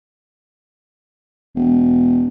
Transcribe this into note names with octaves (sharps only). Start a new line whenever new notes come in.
E1